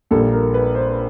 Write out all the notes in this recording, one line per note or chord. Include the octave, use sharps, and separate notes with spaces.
A#1 A#2 G3 A#3 A4
A#4
B4
C5